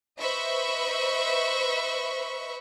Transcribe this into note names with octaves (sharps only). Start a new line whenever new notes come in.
B4 C5 D#5 E5 B5 C#6